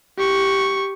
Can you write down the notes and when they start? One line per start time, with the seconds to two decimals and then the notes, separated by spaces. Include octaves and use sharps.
0.18 G4 C#6